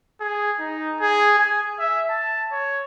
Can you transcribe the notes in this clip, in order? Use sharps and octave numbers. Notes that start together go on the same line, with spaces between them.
G#4
D#4
G#4
G#5
E5
A5
C#5